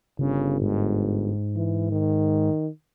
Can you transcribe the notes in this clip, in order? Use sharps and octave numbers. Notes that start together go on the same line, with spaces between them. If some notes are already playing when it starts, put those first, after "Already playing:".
G1 C#3
G#2
E3
D#3